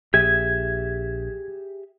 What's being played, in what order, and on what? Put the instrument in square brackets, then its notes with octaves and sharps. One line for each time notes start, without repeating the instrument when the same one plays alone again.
[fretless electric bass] A#1 [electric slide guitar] G4 G#4 E5 [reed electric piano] G#6